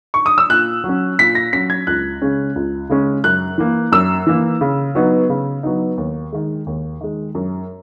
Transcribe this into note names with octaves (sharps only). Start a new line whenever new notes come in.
C#6
D#6
E6
A#2 F#6
F#3
C#4
A#2 B6
A#6
F#3 C#4 B6
G#6
C#2 F#6
C#3 G#3 C#4
C#2
C#3 G#3 C#4
F#2 F#6
E3 A#3
F#2 E6
E3 A#3
C#3
F#3 B3 D#4
C#3
F#3 B3 D#4
D#2
D#3 G#3
D#2
D#3 G#3
F#2